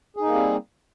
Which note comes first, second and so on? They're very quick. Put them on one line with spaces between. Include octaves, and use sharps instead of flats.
G#4 D#4 A#3 G3 C4